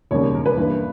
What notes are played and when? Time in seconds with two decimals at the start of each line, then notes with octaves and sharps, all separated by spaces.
0.11 E1 D#2 C#3 G3 C#5
0.34 A#4
0.46 B4
0.57 G2 E3 A#3